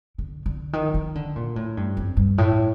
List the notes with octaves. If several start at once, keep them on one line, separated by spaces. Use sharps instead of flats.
D3
D3
D#3
D#3
D3
A#2
A2
G2
F2
G2
A2